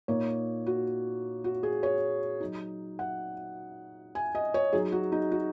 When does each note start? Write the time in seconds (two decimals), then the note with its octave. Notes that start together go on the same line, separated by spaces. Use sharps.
0.08 A#2 A#3 D#4 C#5
0.66 F#4
1.44 F#4
1.63 G#4
1.83 C#5
2.40 F#3 D#4
2.99 F#5
4.15 G#5
4.35 D#5
4.54 C#5
4.73 F#3 D#4 G#4
4.92 F#4
5.12 D#4
5.31 F#4